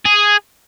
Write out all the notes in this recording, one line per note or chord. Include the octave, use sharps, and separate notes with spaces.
G#4